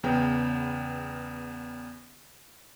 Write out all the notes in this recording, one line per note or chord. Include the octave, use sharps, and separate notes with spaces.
E2 C#3 B3 G5